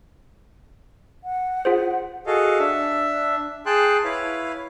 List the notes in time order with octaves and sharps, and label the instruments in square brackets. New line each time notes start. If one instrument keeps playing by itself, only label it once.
[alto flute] F#5
[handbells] F4 G#4 C5
[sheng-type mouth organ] F#4 G#4 A4 D#5 F5
D4 E5
G#4 G5 A5 C6 F#6
E4 B4 C#5 F5